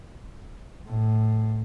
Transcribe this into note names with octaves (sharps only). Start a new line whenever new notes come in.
A2